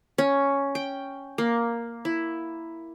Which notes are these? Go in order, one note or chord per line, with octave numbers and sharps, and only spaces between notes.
C#4
G5
A#3
E4